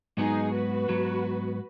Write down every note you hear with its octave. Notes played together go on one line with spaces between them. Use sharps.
G#2 F#3 B3 D#4 G#4
F#4 B4
G#2 F#3 B3